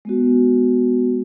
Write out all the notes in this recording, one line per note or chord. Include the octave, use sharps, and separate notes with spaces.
G#3 B3 F#4